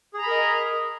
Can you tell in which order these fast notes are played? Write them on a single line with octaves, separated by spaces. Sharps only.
G#4 A#5 B5 A#4 D#5